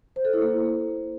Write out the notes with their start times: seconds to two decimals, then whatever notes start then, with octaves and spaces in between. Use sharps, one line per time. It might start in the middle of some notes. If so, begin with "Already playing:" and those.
0.16 C5
0.25 A4
0.33 E4
0.42 A#3